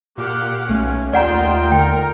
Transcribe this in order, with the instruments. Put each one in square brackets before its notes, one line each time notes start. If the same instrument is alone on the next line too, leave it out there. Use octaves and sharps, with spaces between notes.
[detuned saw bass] A#2 [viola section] G4 F5 F#5
[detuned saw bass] B1 [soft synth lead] A3 [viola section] C#4
[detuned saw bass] D#2 [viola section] D#4 F4 G5 [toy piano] D5 F#5 A#5
[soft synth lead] D3 [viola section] A#4 [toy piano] G5